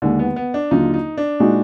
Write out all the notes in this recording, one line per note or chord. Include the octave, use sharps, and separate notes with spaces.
D#2 D3 D#3 G#3
B3
B3
D4
D#2 D3 F#3 D4 D#4 F4
D#4
D4
A#2 G#3 D#4 F#4